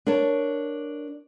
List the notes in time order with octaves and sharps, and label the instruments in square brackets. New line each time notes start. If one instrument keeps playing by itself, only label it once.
[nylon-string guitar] D4 A#4 C#5 A5